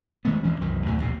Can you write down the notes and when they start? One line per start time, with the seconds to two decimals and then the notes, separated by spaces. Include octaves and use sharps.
0.25 D#3 G#3 A3 B3
0.43 D2 E3 F3 C#4
0.61 C2 F#2 D#3 E3
0.86 D2 A2 D3 D#3
1.00 A#1 D#2 A2 C3